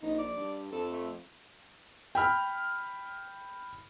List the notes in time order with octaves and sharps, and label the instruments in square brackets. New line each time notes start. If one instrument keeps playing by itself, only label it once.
[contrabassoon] A#1 [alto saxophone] D#4
[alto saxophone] D5
[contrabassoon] G2
[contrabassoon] F2 [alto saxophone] A4
[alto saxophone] A3
[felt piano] G5 B5 F6